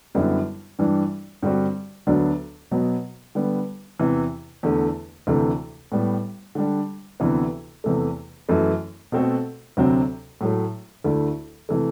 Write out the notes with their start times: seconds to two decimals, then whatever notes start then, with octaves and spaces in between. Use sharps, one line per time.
0.15 F#2 D3 G3 B3 E4
0.79 G2 E3 G3 D4
1.42 G2 D3 G3 C4 F#4
2.07 D2 D3 F#3 B3 D4
2.71 B2 F#3 B3
3.35 D3 G3 B3
3.99 E2 C3 E3
4.63 E2 D3 A3 E4
5.27 D2 C3 E3 A3
5.92 A2 G3 B3
6.55 D3 G3 D4
7.20 D2 C3 E3 B3
7.84 E2 C3 E3 A3
8.49 F#2 E3 A3
9.12 B2 A3 C4 F#4 A4
9.77 D2 C3 F#3 C4
10.41 A2 F#3 A3
11.04 D2 D3 A3 E4
11.69 C3 E3 A3